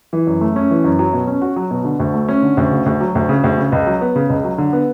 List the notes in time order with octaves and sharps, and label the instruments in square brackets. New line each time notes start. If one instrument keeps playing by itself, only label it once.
[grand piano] E3
F#2
A3
C#4
E3
F#2
F#3
B2
C#4
F#4
F#3
B2
D3
D2
A3
C#4
D3
D2
C#3
D2
F#3
D2
C#3
D2
C#3
C#2
F#3
B3
C#3
C#2
F#3
D3
B3